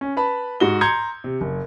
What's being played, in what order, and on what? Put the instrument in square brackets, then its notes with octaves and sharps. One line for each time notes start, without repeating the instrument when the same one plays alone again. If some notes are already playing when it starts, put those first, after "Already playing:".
[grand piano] C#4
B4 A5 B5
G#2 F#4 G7
A#5 C6 G6 G#6 C#7
C3
F#1